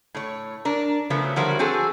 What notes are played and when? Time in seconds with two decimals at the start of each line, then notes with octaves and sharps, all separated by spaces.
0.15 A2 C#5
0.65 D4 A#4
1.10 C#3 F3 F#3 A3 B3
1.36 D3 F3 G3 F#4 A#4 C#5
1.59 C4 F#4 G#4 A4